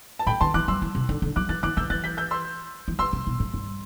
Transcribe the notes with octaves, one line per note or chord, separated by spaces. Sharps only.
A5
A2 G5 B5
D3 A5 C6
E3 D6 F#6
F#3 C6 E6
E3
C3
D3
D3
F#3 D6 F#6
E3 F#6 A6
E3 D6 F#6
D3 E6 G6
E3 F#6 A6
G6 B6
E6 G6
C6 E6
E3
D3 C6 E6
C3
B2
A2
G2